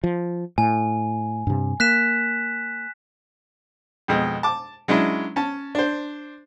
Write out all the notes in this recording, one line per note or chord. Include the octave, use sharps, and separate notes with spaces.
F3
A2 G#5
G2 C3
A#3 F#6 B6 E7
F2 B2 G#3
A5 D6
F#3 G#3 C#4 D4 E4
C#4 A5
D4 C5